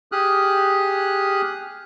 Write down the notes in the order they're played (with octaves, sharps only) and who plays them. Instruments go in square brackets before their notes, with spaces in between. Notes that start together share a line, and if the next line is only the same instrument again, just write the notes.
[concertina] G4 G#4 D#6 F6 F#6